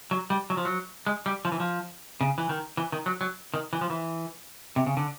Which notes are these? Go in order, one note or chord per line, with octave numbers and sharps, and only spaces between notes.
F#3
G3
F#3
F3
F#3
G#3
G3
F3
E3
F3
C#3
E3
D#3
E3
D#3
F#3
F#3
D#3
E3
F3
E3
C3
C#3
D3